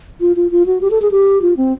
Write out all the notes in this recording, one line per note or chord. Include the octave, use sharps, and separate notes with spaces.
F4
F4
F4
F#4
G4
A4
G#4
G4
F4
C4